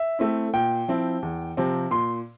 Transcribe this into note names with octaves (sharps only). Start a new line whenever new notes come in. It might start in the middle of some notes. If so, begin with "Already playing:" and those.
Already playing: E5
A3 C4 E4
A#2 G5
F3 C4 E4
E2
C3 F3 C4
A#2 C6